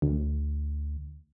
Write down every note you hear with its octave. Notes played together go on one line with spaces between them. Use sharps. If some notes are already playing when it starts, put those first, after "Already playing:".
D2